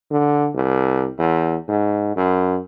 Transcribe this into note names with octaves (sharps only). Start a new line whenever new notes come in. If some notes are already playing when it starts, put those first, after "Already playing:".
D3
C2
E2
G#2
F#2